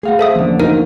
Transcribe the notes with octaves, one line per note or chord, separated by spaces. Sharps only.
A3 G#4 F5 F#5
A4 C5 E5 D#6
E2 D3 F3 A#3 C#4
D#4 F4 F#4 A#4